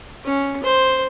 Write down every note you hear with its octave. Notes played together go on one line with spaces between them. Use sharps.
C#4
C5